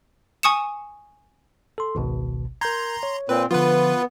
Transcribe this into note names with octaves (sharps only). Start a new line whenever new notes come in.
G#5 C#6 D#6 C#7 E7
A4 C6
G#1 C#2 B2
A#4 A#5 C6 G6 G#6
C#5
A#2 C4 B4
D3 F3 B3 F4 B4